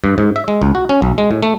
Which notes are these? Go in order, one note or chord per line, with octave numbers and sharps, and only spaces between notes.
G2
G#2
E5
G#3
C#2
F#4
C#4
B1
G#3
A2
A3